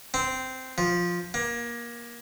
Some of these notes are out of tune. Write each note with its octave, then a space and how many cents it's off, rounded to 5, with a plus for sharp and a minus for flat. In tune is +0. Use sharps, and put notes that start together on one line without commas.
C4 -10
F3 +5
A#3 +25